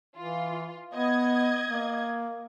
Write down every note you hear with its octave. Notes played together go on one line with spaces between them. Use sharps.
E3 F4
B3 D#5 G#6
A#3